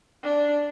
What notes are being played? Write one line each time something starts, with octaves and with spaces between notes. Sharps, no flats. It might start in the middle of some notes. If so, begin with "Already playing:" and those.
D4